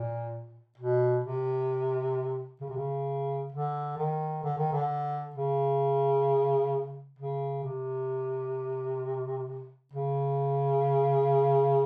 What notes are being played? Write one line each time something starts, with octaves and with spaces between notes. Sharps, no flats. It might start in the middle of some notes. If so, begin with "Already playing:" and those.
Already playing: A#2
B2
C3
C#3
C3
C#3
D3
D#3
D3
D#3
D3
C#3
C#3
C3
C#3